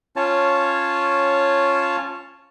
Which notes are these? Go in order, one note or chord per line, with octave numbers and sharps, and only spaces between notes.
C#4 F4 C#5 A5